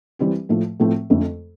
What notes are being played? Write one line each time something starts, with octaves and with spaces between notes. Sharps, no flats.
E3 G3 C4 G4
A2 F3 A3
A2 F3 A3 C4
F2 D3 A3